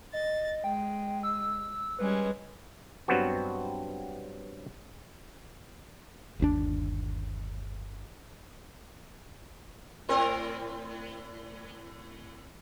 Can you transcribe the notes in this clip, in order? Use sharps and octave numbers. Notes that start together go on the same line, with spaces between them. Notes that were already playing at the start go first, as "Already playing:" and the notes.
D#5 A6
G#3 G5
E6
G3 G#3 C#4 B4
G2 F#3 G3 B3 C4 F#4
G1 D#2 C#4 D4
A2 C4 A#4